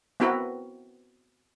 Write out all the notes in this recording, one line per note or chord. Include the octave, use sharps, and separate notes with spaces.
B3 C4 E4 F#4 A#4 B4